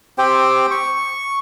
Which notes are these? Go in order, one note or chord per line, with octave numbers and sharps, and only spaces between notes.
C4 G4 C5 G5
C#6